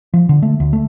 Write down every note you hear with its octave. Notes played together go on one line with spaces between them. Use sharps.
F3
D3
A3
D2
A3